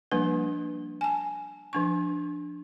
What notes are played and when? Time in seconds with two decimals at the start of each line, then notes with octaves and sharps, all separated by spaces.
0.12 F3 G3 A#3 D4 B4
1.01 G#5 A5
1.73 F3 D4 C#6